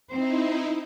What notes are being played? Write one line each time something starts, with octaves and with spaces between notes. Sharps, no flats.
C4 D#4 E4 C5